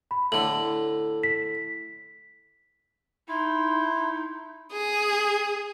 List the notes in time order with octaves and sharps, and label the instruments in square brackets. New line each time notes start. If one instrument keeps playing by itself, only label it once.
[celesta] B5
[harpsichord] A2 D3 [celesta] F#7
[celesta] B6
[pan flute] D#4 [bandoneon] E4 [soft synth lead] C6
[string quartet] G#4